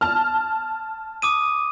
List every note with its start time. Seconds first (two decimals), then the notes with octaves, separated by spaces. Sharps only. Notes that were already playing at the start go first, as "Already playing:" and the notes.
0.01 A5 F6
1.22 D6 D#6 D#7